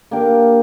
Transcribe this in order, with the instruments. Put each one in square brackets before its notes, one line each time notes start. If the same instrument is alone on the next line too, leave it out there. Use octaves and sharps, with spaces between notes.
[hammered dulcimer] A#3 D4 G4 A#4